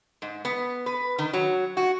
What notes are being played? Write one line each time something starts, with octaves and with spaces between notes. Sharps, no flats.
G#2
B3
B4
D#3
F#3
F#4